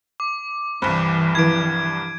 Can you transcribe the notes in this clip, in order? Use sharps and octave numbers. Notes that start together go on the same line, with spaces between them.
D6
C2 G2 E3 C5 B5 F#6
F3 E4 B4 G#6 D7